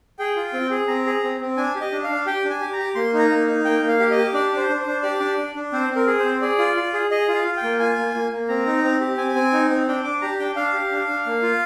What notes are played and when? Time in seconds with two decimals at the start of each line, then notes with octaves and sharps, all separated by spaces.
0.19 G#4 G5
0.36 F4
0.53 C4
0.71 G#4
0.88 C4 A#5
1.06 G#4
1.23 C4
1.41 C4
1.57 D4 G#5
1.75 G4
1.81 D#5
1.92 D4
2.04 F5
2.09 D4
2.26 G4 G5
2.44 D4
2.50 G#5
2.61 G4
2.73 A#5
2.78 G4
2.95 A#3 C6
3.14 D#4
3.19 A#5
3.30 A#3
3.47 D#4
3.64 A#3 G5
3.82 A#3
3.88 F5
4.00 G4
4.11 D#5
4.17 G4
4.33 D4 D5
4.52 D4 C5
4.69 D4
4.81 C5
4.86 D4
5.03 G4 D5
5.20 D4
5.38 D4
5.55 D4
5.73 C4 C5
5.89 C4
5.96 A#4
6.07 G#4
6.19 C4 C5
6.41 G#4 D5
6.58 F4
6.77 F4
6.94 G#4
7.11 G#4 D#5
7.28 F4
7.34 F5
7.45 F4
7.57 G5
7.63 A#3
7.79 F4 G#5
7.98 A#3
8.14 A#3
8.32 A#3
8.48 C4 A#5
8.66 D#4
8.84 C4
9.00 G4
9.18 C4 G#5
9.35 C4
9.52 D#4
9.70 C4
9.88 D4 G5
10.04 D4 D6
10.22 G4 A#5
10.39 D4 G5
10.56 D4 F5
10.73 G4
10.91 D4
11.08 D4
11.26 A#3
11.42 F4